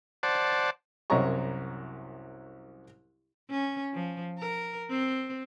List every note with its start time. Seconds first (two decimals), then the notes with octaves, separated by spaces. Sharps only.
0.23 C5 D5 F#5 A5
1.10 C2 F#2 C#5 A#5 C#6
3.51 C#4
3.93 F3
4.38 A#4
4.90 C4